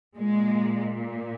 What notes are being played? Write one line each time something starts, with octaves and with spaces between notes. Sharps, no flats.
A#2 G#3